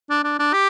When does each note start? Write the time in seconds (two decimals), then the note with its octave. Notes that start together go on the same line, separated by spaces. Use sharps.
0.10 D4
0.24 D4
0.39 D4
0.53 G4